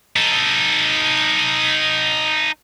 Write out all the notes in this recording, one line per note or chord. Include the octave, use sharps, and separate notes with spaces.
D#4 A4